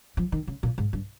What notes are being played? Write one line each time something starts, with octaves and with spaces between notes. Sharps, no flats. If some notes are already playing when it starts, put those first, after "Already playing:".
F3
D#3
C#3
A#2
G#2
G2